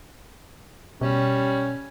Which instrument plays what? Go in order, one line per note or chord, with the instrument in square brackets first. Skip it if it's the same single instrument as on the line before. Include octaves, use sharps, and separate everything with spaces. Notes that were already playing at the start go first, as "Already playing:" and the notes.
[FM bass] B2 [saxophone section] G3 C#4